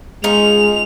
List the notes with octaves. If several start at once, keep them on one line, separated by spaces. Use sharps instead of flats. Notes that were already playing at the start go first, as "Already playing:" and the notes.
G#3 C#4 D#4 F4 F7